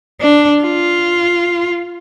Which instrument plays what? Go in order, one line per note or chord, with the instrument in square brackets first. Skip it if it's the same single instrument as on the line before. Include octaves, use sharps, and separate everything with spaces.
[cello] D4
F4